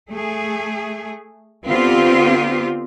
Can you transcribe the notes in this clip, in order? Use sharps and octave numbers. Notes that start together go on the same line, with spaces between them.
A3 G#4
D3 B3 C4 F4 G4